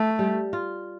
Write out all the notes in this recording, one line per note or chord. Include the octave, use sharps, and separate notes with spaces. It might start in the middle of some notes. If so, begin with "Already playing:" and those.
Already playing: A3
G3
F4